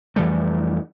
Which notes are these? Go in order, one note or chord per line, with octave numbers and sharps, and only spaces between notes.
F2 E3 G3 A3